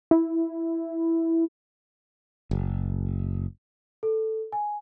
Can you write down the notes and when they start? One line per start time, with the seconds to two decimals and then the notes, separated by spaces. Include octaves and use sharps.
0.11 E4
2.51 F#1
4.03 A4
4.52 G#5